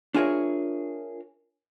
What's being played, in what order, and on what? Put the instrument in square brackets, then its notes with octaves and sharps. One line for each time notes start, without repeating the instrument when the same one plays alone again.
[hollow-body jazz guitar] D4 F4 G#4 A#4 C#5 E5